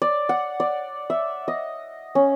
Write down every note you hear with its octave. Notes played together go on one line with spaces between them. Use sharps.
D5
F#5
D5
E5
D#5
C#4